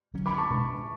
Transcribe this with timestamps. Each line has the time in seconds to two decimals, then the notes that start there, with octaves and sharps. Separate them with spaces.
0.14 D3 F#3 C#4
0.26 B5 D6
0.38 A5 C#6
0.50 B2 G#3 D4